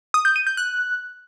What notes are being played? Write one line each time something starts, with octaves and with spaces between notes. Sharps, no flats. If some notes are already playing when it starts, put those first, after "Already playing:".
D#6
G6
D#7
G6
F#6